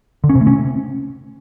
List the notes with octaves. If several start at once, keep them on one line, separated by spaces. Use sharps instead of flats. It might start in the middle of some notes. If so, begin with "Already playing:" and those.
D3
C#4
C3
A3
C#4